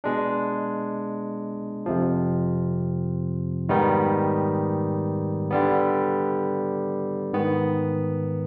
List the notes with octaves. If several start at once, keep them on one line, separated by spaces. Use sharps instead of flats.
B2 G#3 D4
F2 C3 F3
G#2 D#3 G3 B3 D#4
D3 G3 B3
G#2 D#3 B3